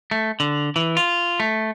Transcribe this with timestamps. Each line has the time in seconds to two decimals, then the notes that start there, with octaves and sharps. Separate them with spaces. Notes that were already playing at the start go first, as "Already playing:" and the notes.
0.11 A3
0.40 D3
0.76 E3
0.97 F4
1.40 A3